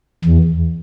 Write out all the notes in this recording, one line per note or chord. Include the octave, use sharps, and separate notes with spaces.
E2